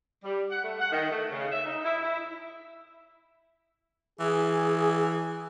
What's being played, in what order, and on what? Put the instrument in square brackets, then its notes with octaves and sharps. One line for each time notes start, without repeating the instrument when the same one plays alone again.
[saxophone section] G3
F#5
A3
F#5
D#3
A3
C#3
E5
D#4
E4
E4
[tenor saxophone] E3 [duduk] G#4